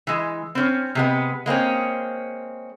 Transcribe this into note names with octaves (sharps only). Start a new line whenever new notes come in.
E3 G#3
C4 C#4
C3 G#3 B3
G#3 A#3 C4 C#4